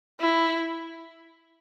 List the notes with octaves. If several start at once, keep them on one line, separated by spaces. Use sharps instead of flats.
E4